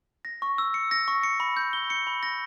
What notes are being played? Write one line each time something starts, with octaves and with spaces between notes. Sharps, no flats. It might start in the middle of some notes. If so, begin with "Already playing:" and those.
A#6
C#6
E6
C#7
A#6
C#6
C#7
B5
G6
G7
C#7
B5
A#6